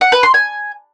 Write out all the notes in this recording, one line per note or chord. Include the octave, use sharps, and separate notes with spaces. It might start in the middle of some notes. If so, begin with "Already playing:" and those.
F#5
B4
C6
G#5